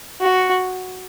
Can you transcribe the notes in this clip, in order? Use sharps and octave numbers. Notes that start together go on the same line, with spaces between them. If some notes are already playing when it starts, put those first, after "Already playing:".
F#4